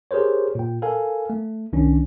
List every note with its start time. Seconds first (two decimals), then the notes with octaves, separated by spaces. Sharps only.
0.11 G4 G#4 A#4 C5 C#5
0.55 A#2 G5
0.82 A4 A#4 F5 G#5
1.30 A3
1.73 C2 D#3 C#4 D4